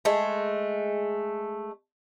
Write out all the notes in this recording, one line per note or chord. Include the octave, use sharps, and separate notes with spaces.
G#3 A3